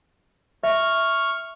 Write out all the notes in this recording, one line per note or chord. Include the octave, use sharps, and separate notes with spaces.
E5 C#6 F6